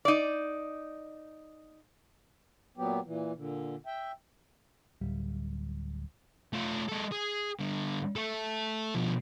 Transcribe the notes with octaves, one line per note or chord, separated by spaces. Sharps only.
D#4 D5
A#2 F#3 B3 G4
A#2 E3
A#2 D3
E5 G5
D1 G3
A3 F4
G#3 A4
G#4
G2 D3
A3 A4
B2 F3